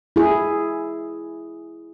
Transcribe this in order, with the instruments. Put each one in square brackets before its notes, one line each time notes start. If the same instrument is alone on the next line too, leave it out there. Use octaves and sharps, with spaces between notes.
[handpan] E4 G#4